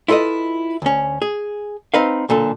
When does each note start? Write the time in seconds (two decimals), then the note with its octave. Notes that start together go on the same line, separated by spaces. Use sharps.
0.08 E4 F4 A4 B4 D#5
0.82 D2 C#4
1.22 G#4
1.94 C4 D#4 B4 F5
2.29 B1 A#2 D3 A4